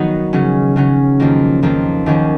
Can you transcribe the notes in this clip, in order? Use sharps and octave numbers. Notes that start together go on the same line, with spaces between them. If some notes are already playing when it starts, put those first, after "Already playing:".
Already playing: D#3 F#3 B3 D#4 F#4
C#3 F#3 C#4
C#3 F#3 C#4
F2 D#3 A#3 F4
F2 D#3 A#3 F4
D#2 D#3 F#3 C#4